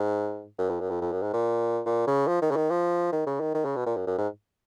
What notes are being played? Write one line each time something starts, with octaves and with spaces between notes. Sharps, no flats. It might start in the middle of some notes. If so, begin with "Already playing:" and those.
Already playing: G#2
F#2
F2
F#2
F2
F2
F#2
G#2
A#2
A#2
C#3
F3
D#3
C#3
D#3
F3
D#3
C#3
D#3
D#3
C#3
B2
A#2
F#2
F#2
G#2